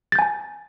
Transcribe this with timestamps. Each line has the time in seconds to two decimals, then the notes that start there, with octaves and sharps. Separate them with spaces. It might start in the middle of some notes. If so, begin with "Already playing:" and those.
0.12 A6
0.15 G6
0.19 G#5
0.22 A5